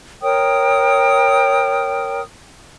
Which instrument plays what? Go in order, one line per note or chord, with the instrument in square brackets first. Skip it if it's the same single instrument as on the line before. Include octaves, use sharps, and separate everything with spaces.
[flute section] A#4 C#5 G5 D#6